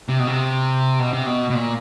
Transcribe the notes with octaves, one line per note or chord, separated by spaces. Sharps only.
C3
B2
C3
B2
C3
B2
B2
A#2